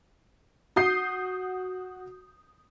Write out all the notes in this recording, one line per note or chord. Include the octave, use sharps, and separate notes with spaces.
F#4 D#6 G6 C7